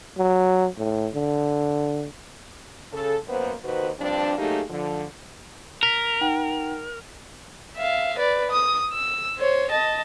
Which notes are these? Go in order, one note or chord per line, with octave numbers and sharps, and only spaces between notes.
F#3
A2
D3
C#3 A4
F#2 A#3 B3 B4 C5
D#2 D#3 F#4 B4 C5
G2 F3 C4 D4
F#3 A3 A#3 D#4 G4 G#4
D3 F3
A#4 B6 F7
D#4 F#5 G5
E5 F5
B4 D5
D#6
E6
C5 C#5
D#5 A5